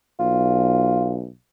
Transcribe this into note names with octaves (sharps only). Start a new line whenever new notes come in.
B1 F4